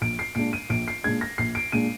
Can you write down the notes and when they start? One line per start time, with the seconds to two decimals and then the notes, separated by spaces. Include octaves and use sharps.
0.01 A#1 D7
0.19 C7
0.35 A#2 G#3 D4 D7
0.53 D#7
0.70 A#1 D7
0.88 C7
1.04 A#2 G#3 D4 G#6
1.21 A#6
1.38 A#1 C7
1.55 D7
1.72 A#2 G#3 D4 D#7